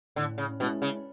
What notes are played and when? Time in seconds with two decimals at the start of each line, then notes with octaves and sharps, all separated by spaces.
0.16 A2 D3
0.38 C#3
0.60 B2 G#3 C#4 E4
0.82 C#3